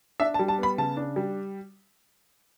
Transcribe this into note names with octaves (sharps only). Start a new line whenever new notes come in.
D4 E5
A5
G3
A5
B3 B5
C#3 A5
D4
G3